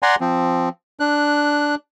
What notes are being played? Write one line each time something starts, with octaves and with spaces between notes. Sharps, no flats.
D5 F#5 G#5 A#5 C6
F3 C4
D4 F#6